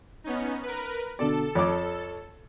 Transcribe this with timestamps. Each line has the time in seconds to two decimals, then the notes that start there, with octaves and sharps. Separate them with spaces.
0.24 B3 C#4 D#4
0.63 A#4 B4
1.19 B2 D3 A4 D5
1.55 F2 C#5 D6